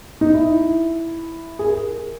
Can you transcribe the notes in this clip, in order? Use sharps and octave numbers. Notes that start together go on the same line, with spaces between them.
D#4
E4
G#4
A#4